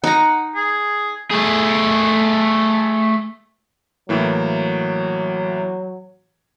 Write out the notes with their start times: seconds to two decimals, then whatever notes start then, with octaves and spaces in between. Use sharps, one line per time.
0.04 D#4 F#5 A#5
0.56 G#4
1.31 A3 G#4
4.09 A2 E3 F#3 A#3